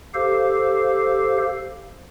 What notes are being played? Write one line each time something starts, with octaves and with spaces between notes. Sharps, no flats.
G4 A4 C5 F5